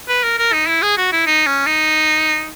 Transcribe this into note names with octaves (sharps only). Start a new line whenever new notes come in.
B4
A#4
A#4
D#4
E4
G#4
F#4
E4
D#4
C#4
D#4